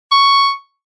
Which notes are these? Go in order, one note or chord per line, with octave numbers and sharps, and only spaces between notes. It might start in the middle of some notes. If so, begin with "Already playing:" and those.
C#6